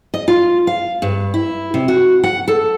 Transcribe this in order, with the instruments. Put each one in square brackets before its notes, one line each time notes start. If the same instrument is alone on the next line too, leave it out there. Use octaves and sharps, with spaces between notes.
[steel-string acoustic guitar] D#5
F4
F5
G2
E4
C3
F#4
F#5
A4